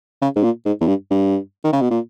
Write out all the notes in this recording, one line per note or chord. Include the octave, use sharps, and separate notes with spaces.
C#3
G#2
A#2
G#2
E2
G2
G2
D#3
C#3
B2
A#2